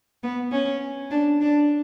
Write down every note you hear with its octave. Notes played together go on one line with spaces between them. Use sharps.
B3
C#4
D4
D4